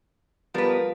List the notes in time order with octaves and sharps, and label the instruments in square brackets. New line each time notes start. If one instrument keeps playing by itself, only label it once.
[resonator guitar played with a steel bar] F3 B4 [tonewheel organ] G3 B3 A#4